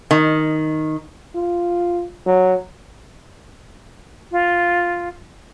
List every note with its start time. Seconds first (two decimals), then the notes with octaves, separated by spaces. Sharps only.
0.11 D#3
1.35 F4
2.26 F#3
4.31 F4